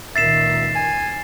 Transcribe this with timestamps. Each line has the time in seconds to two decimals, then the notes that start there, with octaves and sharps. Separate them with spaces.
0.16 C#2 A#2 D#3 E5 A6 C7 E7
0.75 G#5